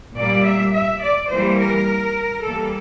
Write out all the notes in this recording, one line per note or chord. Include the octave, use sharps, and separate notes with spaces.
A#2 G3 A#3 D5
E5
E5
D5
E3 G3 A#3 C5
A#4
E3 G3 A#3 A4